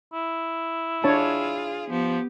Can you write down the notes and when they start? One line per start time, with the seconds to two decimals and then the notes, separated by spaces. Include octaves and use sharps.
0.13 E4
1.04 D4 F4 G#4 C#5 A5
1.90 F3 B3 G4